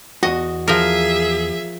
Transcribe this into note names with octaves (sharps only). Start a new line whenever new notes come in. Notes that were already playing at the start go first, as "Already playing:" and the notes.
E2 F#4 D#5
F3 G#4 A#4 E5